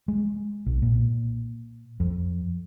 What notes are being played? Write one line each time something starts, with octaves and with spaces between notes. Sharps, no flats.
G#3
B1
A#2
F2